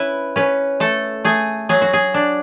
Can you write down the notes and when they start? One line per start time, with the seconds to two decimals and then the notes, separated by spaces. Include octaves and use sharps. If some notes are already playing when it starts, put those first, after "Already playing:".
Already playing: C#4 E4 B4
0.36 C#4 B4
0.80 A3 A4
1.24 A3 G#4
1.69 F#3 G#4
1.82 F#4
1.93 G#4
2.14 D4